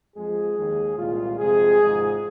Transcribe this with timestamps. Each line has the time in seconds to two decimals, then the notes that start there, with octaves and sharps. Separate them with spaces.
0.17 F2 F3 G#3 G#4
0.58 D#2 D#3 G#3
0.98 C2 A#2 G#3 F4
1.39 F2 C3 G#3 G#4
1.78 G#1 G#2 F3